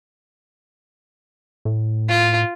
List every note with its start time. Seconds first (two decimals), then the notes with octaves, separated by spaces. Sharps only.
1.65 A2
2.08 F4